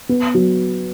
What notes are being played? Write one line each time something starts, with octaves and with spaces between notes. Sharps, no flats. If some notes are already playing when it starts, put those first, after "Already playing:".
B3
F#3